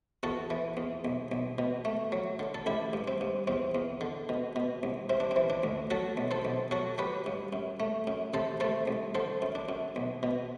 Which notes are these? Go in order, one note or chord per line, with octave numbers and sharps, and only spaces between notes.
E2 F#4 A4
E3
E2
B1
B1
B2
A3
F#3
D3
A4
A1 E4 G4
G2
C4
G2
E2 C4
E2
D3
B2
B2
C2
C3 C4
D4
C4
E3
D4
D2
F#3 F#4 A4
B1
A4 C5
B1
F#3 F#4 A4
F#3 G4 B4
G2
F#2
A3
F#2
C3 A4 C5
A3 A4 C5
C2
D3 A4 C5
F#2
D4
F#2
B1
B2